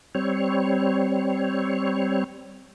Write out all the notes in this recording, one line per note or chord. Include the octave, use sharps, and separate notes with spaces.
G3 C4 C#5